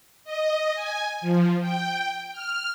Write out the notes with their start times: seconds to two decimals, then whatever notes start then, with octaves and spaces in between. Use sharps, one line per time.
0.24 D#5
0.75 G#5
1.21 F3
1.61 G5
2.32 F6